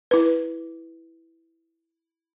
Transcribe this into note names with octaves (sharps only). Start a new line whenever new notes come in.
E4 B4